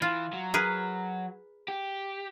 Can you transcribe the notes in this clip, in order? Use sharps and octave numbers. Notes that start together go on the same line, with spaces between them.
E3 F4
F#3
G#4 A#4 B4
G4